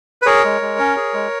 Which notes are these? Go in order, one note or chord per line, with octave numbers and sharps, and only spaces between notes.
B4
G#4 A#4 C#5
G#3
G#3
C#4
G#4
G#3